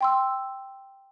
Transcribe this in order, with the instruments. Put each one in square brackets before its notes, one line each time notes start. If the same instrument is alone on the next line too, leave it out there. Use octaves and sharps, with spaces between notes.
[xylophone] G5 C6 E6